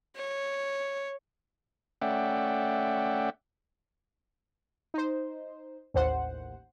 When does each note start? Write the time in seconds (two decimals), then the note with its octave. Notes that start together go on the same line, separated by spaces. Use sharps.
0.16 C#5
2.02 A3 C#4 D5 E5 F#5 G5
4.94 D#4 C5
5.94 A1 D#2 C5 F#5